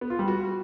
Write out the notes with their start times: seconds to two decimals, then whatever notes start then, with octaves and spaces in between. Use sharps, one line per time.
0.01 B3
0.10 F4
0.19 G3
0.28 F#4